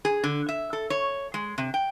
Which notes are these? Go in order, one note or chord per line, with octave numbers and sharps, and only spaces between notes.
G#4
D3
E5
A4
C#5
G#3
C3
G5